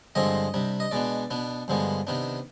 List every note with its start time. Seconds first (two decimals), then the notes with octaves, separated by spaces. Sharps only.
0.15 G2 D3 F3 G#3 C4 D#5
0.54 C3 G3 D4
0.80 D#5
0.91 B2 G#3 B3 D4 D5
1.31 B2 B3 D4
1.68 G2 D3 F3 G#3 B3
2.07 C3 D#3 B3 D4